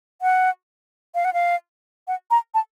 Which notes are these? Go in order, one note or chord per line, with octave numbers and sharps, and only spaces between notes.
F#5
F5
F#5
F5
F#5
A#5
A5